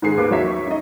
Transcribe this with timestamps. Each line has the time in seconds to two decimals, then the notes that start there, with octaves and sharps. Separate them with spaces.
0.02 G#2 D#3 G#4 C7
0.18 D#2 B4 D6
0.31 F#3 C#5 E5 B6
0.47 C#6
0.66 D#4 D#5